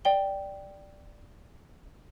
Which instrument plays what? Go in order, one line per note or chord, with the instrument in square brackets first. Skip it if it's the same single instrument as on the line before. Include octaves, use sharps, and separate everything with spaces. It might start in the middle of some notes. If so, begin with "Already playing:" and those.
[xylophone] D5 G5 G7